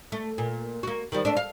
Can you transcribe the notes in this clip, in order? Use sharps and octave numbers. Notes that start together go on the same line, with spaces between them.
A3
A#2
A#3 F#4
D#3 F3 G3
A3 D4
F5